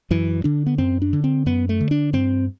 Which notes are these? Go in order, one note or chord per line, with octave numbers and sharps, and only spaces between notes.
F#2 E3
D3 D4
B3
F#2 C4
D4
D3
C4
F#2 B3
A3
D3
D4
G2 C4